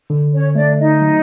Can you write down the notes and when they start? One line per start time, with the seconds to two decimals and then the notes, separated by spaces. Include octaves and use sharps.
0.10 D3
0.33 C#4 C#5
0.55 A3 D4 D5
0.78 D#4 D#5
1.01 F#3